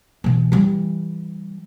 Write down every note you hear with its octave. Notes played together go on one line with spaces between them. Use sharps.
B2 E3
E3 G3